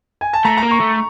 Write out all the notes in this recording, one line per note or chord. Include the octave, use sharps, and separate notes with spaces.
G#5
A5
A3 A#5
A#5
A#3
C#6
A3